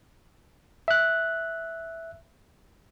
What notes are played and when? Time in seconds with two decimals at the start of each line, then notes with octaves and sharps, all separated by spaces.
0.88 E5 F#6